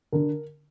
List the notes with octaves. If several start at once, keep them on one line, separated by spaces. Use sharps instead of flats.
D3 A#4